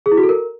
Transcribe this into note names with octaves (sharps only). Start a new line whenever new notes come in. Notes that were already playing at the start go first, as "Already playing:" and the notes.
G#4
E4
F#4
A4
A#4